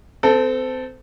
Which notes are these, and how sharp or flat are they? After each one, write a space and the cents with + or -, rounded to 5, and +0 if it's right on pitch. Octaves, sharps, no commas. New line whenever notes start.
C4 -30 A4 +0